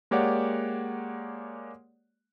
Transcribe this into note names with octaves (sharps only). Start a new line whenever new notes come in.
G#3 A#3 G4 C#5 D5 F#5